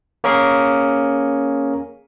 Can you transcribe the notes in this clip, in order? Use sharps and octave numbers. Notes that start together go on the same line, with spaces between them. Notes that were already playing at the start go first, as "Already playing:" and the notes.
A#3 C#4 G#4 A#4